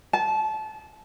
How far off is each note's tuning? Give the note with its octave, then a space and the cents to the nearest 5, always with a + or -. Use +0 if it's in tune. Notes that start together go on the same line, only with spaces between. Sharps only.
A5 -25